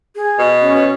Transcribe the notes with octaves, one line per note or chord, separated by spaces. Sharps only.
G#4
B2
C#4
B2